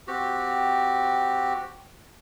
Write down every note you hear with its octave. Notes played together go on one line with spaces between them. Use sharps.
C4 F#4 G4